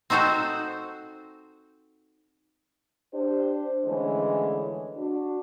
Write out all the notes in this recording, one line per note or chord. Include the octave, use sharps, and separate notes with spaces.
C4 D#4 F#4 A4 C5
D4 G4 C5
D3 E3 F3 G#3 A3 C#4
D4 F#4